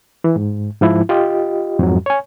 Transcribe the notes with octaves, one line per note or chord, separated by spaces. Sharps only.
E3
G#2
G#2 F3 E4
F4 G4 D#5
F2 G#2 F#3
C#5 G#5